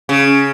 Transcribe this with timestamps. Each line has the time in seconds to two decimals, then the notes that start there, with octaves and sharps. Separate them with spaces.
0.09 C#3